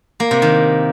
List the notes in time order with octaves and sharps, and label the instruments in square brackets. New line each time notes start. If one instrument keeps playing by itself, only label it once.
[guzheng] A#3
C3
D#3